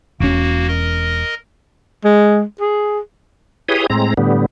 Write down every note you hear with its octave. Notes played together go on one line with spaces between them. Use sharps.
E1 A#3 C#4 F#4
A#4 D#5
G#3
G#4
E4 G4 G#4 B4 C#5 D#6
A2 G#3 C4 A#5
A2 D3 G3 B3